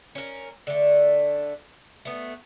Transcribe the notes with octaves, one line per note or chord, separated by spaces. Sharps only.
C#4 A#4
D3 A3
A3 B3